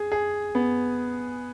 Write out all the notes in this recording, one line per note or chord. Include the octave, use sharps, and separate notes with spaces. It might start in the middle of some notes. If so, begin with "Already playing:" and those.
Already playing: G#4
G#4
B3